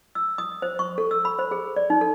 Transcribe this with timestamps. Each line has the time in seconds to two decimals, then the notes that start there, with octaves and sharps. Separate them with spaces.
0.15 E6
0.38 D#6
0.62 C5
0.79 C#6
0.98 A4
1.11 E6
1.25 B5
1.39 C5
1.51 G#4
1.76 D5
1.90 D#4
2.01 A4